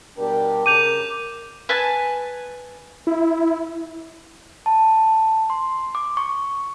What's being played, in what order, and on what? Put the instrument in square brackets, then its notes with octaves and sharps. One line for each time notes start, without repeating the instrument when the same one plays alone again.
[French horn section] B2 G3 A#4 [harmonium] D4 G4
[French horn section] C#3 A#4 [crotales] D6 G6 F7 [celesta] D#7
[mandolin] B4 G#5 A5
[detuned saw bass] E4
[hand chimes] A5
C6
D6
C#6